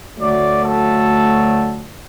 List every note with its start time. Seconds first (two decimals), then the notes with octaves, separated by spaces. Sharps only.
0.19 D2 D3 F#3 A3 D5
0.61 A4